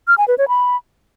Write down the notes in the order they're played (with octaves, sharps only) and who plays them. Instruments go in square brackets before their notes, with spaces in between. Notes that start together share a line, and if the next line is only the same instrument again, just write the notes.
[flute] F6
G#5
B4
C#5
B5